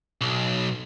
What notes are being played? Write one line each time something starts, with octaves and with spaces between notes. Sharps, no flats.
B1